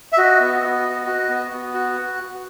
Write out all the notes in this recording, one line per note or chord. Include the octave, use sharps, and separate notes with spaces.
E5
F#4 D#5
B3
B3
F#4
F#4
B3
B3
F#4